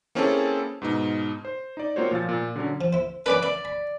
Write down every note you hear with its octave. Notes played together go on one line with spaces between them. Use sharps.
A#3 C4 C#4 E4 G#4 A4
G#2 B2 D#4
C5
D#4 D5
A#3 C4 F4 F#4 C5 C#5
A#2 F3 F5 A6
A#2
D3 F#3 C#4
F3
E4 C5
F#3 C#4 D4 B4 D5 D6
D5 E5
B5